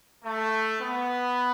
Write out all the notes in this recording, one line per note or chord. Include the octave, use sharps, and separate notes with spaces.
A3
B3